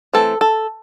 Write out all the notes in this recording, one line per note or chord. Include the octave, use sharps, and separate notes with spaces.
E3 A3 C4 A4
A4